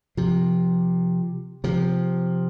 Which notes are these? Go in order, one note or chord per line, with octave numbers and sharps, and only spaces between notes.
C3 F3
C3 F3